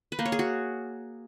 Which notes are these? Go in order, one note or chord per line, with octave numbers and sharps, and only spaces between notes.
B4
A#3
C#5
G#4
F#4